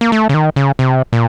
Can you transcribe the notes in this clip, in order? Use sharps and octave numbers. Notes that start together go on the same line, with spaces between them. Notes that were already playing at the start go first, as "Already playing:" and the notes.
A#3
A3
C#3
D#3
C#3
C3
A#2